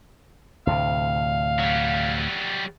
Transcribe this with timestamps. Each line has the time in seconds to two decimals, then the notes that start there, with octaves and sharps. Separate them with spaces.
0.67 D2 A2 C3 F5
1.59 F#3 G3